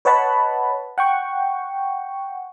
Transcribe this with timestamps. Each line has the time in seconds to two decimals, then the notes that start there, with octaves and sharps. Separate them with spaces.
0.05 B4 C#5 D#5 F#5 A5 B5
0.98 F#5 G5 C#6